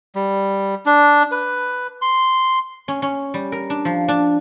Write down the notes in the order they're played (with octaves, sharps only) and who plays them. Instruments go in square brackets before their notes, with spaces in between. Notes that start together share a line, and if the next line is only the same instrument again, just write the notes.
[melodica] G3
D4
B4
C6
[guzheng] C#4
C#4
G3
A#4
D4
F3
D4